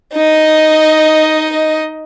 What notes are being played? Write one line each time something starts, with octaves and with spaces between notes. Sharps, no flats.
D#4 D#5